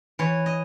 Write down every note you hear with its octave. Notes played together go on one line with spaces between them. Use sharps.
E3 C#5
D#5